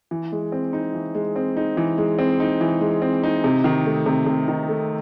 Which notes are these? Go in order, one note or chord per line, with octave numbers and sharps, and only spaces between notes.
E3
G#3
C4
D#4
E3
G#3
C4
D#4
E3
G#3
C4
D#4
E3
G#3
C4
D#4
C3
D#3
A3
C3
C3
D#3
A3